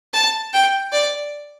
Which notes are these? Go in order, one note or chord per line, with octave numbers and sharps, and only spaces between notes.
A5
G5
D5